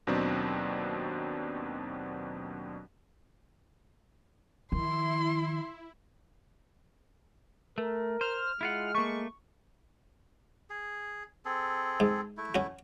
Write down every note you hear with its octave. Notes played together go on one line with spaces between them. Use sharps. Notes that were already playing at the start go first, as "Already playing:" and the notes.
D#2 B2 F#3 C4 D4 D#4
D#3 F3 E4 C6
A3 A#4
C5 F6
G#3 E4 F4 F#5
A3 A#3 C#6
G#4
C4 G#4 A4
G#2
A3 E4
C#4 F#4